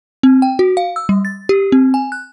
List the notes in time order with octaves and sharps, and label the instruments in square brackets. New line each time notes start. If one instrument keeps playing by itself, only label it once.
[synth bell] C4
G5
F#4
F5
E6
G3
A6
G4
C4
G#5
F#6